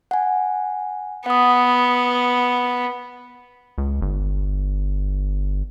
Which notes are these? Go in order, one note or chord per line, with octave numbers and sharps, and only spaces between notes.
F#5 G#5
B3 F#5 D#6
C#2
G1